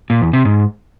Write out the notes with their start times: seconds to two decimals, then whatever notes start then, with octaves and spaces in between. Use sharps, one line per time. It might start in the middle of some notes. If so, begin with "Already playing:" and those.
0.10 A#2
0.22 E2
0.33 C3
0.45 G#2